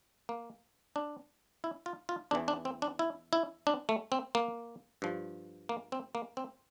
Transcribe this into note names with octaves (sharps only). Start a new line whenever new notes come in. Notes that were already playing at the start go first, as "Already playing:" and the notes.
A#3
D4
E4
F4
F4
E2 E3 D4
D4
C4
D4
E4
E4
D4
A3
C4
A#3
G2 F3
A#3
C4
A#3
C4